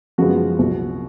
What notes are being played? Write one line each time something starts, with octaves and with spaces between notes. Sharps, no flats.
F#2 C#3 F3 G#3 B3 F#4
C2 A#2 F#3